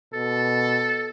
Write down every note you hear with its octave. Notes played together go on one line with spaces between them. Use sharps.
B2 A4